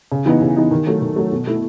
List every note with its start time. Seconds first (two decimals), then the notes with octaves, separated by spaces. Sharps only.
0.12 C#3
0.26 E3 B3 D#4
0.42 C#3
0.57 E3 B3 D#4
0.71 D#3
0.86 F#3 A3
1.02 D#3
1.16 F#3 A3
1.32 B2
1.47 A3 E4